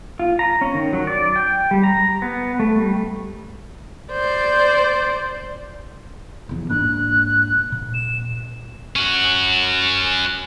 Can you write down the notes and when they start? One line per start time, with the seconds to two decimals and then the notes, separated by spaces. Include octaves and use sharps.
0.19 F4
0.39 A#5
0.61 C#4
0.75 D#3
0.93 F#3
1.07 D5
1.36 G5
1.71 G3
1.84 A#5
2.22 B3
2.60 A3
2.78 G3
4.12 C5 D5
6.49 F1 E2
6.69 G#2 A#3 D4 F#6
7.72 A#2
7.94 E7
8.96 C#4 F#4